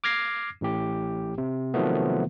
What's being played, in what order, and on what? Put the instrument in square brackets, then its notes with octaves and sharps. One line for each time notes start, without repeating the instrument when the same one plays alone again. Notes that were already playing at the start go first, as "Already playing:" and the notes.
[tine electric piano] D6 F6 G#6 A#6 C7
A1 A2 G4
C3
C3 D#3 F3 F#3 A3 B3